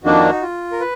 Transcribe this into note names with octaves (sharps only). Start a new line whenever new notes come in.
F2 D#3 A#3 D4 F#4
D#4
F4
A#4
B4